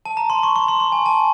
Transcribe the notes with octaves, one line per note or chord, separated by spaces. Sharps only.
A5
A#5
C6
C#6
C#6
C6
C6
G#5
A5